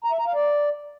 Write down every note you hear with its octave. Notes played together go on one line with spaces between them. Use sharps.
A#5
E5
A#5
F5
D5